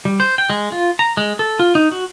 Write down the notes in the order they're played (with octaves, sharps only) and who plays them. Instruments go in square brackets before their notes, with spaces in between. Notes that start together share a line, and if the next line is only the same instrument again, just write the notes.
[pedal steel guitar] G3
C5
G5
G#3
F4
A#5
G#3
A4
F4
D#4
F#4